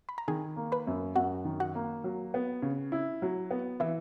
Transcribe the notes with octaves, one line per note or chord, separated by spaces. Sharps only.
B5
A#5
D#3 G#4 G#5
A#3
B4 B5
F#2
F#2 F#4 F#5
D#3
F#4 F#5
A#3
F#3
B3
C#3
E4
F#3
B3
E3 E4 E5